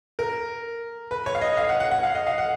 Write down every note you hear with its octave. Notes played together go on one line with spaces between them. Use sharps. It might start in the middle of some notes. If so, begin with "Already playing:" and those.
A#4
B4
C#5
F5
D#5
F5
F#5
F#5
F#5
F5
D#5
F5
F#5